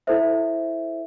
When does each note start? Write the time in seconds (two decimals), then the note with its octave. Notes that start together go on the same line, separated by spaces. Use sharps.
0.07 E4 A4 C5 E5